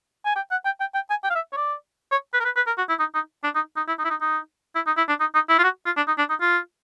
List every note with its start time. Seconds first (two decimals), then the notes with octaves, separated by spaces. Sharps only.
0.25 G#5
0.36 G5
0.51 F#5
0.65 G5
0.80 G5
0.95 G5
1.10 G#5
1.24 G5
1.30 F5
1.35 E5
1.53 C#5
1.57 D5
2.11 C#5
2.34 B4
2.40 A#4
2.45 B4
2.56 B4
2.67 A#4
2.78 F#4
2.89 E4
2.99 D#4
3.15 D#4
3.44 D4
3.55 D#4
3.77 D#4
3.88 E4
3.99 D#4
4.05 E4
4.10 D#4
4.21 D#4
4.75 E4
4.87 D#4
4.97 E4
5.09 D4
5.20 D#4
5.35 D#4
5.49 E4
5.59 F4
5.64 F#4
5.86 F4
5.97 D4
6.07 D#4
6.18 D4
6.30 D#4
6.41 F4